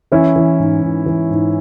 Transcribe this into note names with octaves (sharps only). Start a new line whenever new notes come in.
E3 C#4 E4
E3
G#2
G#2
E3
G#2